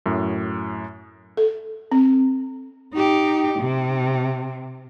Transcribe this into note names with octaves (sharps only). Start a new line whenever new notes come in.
F#2 A2
A4
C4
D#4 G4
C3